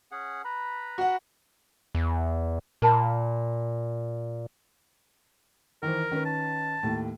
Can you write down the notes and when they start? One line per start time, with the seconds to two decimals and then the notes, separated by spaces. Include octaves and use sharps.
0.12 C#4 G#4 F#5
0.45 B4 A#5 B5
0.98 F#4 F#5
1.95 E2
2.82 A#2 A#4 A5 B5
5.83 D#3 E3 A#4 C5
6.11 D#3 C#4 B4
6.25 A5
6.83 D#2 A2